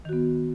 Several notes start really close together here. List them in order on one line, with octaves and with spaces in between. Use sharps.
D#3 F#4 B3